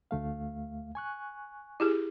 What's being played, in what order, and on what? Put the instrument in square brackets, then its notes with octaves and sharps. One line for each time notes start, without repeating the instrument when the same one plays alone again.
[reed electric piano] D2 A3 F5
G#5 C#6 F#6
[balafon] E4 G4 G#4